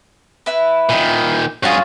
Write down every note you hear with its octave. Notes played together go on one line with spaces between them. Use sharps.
E4 B4
A#2 D#3
G2 F4 F#4 G#4 C#5